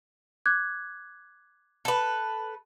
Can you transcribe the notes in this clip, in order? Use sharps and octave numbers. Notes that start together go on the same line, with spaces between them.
D6 F#6 G#6
A4 B4